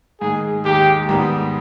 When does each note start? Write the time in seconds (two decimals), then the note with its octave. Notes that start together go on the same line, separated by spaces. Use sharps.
0.21 G#2 D#3 G#3 G#4
0.65 D#2 D#3 G#3 G4
1.09 G#2 D#3 G3 B3